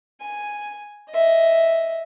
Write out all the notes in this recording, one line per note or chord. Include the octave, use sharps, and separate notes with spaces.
G#5
D#5 E5